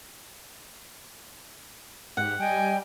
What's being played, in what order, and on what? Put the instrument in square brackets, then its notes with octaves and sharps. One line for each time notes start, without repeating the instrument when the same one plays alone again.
[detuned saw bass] G#2 [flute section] G4 [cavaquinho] F#5
[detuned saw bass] G3 [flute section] D#5 G5 G#5